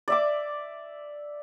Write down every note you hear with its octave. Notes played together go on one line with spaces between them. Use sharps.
D5 E5 D6